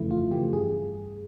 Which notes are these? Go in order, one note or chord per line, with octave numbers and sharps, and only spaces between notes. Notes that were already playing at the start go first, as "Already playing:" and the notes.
Already playing: G1 F2 C#3 E3 A3 E4
G1 F4
F2 C#3 E3 A3 G4
G2 G#4